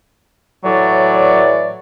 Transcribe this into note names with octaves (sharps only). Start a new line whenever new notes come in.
A2 E3 F#3 D5